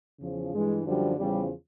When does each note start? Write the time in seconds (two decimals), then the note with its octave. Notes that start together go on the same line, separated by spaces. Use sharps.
0.20 E2 C#3 F3
0.53 G2 E3 G#3
0.86 F#2 D3 F3 G3
1.18 E2 C#3 F3 G3